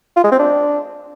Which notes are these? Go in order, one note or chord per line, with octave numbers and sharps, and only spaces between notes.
F4
G#3
C4
D4